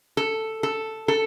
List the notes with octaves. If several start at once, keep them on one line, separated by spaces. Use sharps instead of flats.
A4
A4
A4